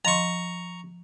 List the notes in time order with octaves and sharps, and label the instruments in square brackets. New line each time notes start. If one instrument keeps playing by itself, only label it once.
[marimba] F3 D#5 C6 [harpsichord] A#5 C#6